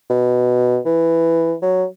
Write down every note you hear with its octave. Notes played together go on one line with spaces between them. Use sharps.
B2
E3
F#3